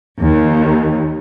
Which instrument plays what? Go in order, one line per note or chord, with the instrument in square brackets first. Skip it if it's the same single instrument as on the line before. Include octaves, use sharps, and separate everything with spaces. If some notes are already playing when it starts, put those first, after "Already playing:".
[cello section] D#2